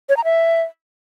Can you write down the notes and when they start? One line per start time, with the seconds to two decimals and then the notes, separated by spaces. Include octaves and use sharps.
0.09 C#5
0.17 A#5
0.24 E5